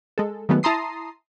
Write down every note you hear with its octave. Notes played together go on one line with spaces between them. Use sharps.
G#3 A4
D#3 F#3 G#3 A3 B3
E4 A5 A#5 C6 D#6 C7